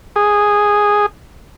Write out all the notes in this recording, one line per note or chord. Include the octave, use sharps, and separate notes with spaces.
G#4